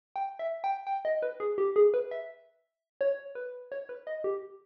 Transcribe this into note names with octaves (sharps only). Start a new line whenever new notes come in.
G5
E5
G5
G5
D#5
B4
G#4
G4
G#4
B4
E5
C#5
B4
C#5
B4
D#5
G4